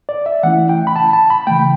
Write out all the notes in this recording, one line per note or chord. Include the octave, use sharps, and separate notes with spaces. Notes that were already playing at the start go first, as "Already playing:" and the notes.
D5
E5
E3 A3 C#4 E4 F#5
G5
B5
A5
A5
B5
C#3 E3 A3 G5